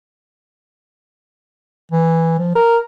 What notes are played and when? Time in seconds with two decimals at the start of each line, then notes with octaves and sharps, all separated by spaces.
1.91 E3
2.38 F3
2.55 A#4